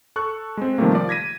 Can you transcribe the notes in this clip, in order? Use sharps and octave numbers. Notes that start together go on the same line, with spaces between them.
A4 C#6 F#6
G#3 C4
C3 D#3 F3 G3 A3 A#3
F3 D5 D6
G#6 A#6 B6 D#7